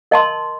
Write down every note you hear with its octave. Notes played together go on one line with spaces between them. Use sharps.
A#4 D#5 A5 C6